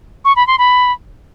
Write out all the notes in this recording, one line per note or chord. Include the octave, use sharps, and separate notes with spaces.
C#6
B5
C6
B5